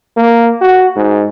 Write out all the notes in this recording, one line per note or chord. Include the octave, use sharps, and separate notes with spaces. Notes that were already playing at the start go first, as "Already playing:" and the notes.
A#3
F#4
G#2